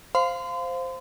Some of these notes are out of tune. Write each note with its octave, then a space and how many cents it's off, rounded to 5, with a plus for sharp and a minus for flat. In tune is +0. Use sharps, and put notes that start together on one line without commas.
C5 +0 F5 +0 C6 -35